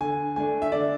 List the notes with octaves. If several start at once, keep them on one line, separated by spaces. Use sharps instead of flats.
D3 G#5
A3 D4 G#5
E5
D3 D5